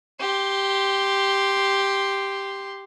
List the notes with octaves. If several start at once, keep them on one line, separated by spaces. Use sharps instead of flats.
G4 C6